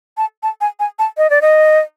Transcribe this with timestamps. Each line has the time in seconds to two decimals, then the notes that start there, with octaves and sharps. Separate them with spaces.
0.17 A5
0.43 A5
0.61 G#5
0.80 G#5
0.99 A5
1.18 D#5
1.30 D5
1.42 D#5